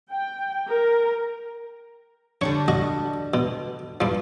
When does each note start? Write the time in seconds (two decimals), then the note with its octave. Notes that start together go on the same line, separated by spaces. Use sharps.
0.12 G5
0.68 A#4
2.41 D3 G3 D4 C#5
2.68 F#4 D#5
3.34 B2
4.01 G2 F3